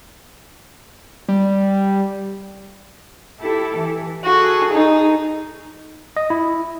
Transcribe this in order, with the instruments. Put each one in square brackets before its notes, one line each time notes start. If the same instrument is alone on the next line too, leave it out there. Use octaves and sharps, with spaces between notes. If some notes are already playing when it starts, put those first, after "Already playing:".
[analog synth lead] G3
[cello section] E4 G4 A4
E3
[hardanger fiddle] F#4 [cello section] G#4 A4
[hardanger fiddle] D#4
[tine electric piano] D#5
E4